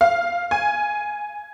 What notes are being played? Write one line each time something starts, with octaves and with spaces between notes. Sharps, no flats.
F5
G#5